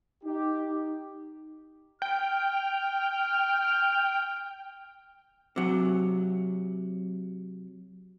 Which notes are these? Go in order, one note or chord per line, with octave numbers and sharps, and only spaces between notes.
D#4 G4
G5 F6
C3 F#3